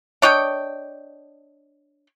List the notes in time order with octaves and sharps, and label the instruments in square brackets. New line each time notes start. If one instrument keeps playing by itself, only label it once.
[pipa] D4 C#5 D#5 G5